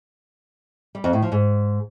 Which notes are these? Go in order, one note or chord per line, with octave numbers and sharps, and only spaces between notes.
G3
F2
A2
F3
G#2